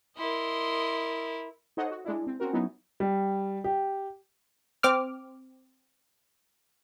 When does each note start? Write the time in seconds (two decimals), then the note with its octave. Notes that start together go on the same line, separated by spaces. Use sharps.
0.17 E4 A#4 D#5 C6
1.77 D#4 A4 C5 C#5 D#5 F#5
1.91 F#4
2.05 G#3 D4 E4
2.27 C4
2.40 C4 C#4 F#4 A#4
2.53 F#3 B3 C#4 D#4 E4
3.00 G3
3.64 G4
4.83 C4 D6 F6